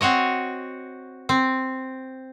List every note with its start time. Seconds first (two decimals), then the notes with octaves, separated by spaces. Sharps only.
0.01 C4 F#4 C#5 D#5
1.29 C4